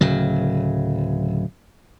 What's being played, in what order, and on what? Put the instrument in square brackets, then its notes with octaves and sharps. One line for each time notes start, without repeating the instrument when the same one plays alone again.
[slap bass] D1 C#3 F#3